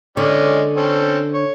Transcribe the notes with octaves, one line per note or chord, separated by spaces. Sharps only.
D3 G#3 C#4 D5
C4 C#4 A4
C#5